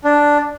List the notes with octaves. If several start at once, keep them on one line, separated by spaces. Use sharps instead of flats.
D4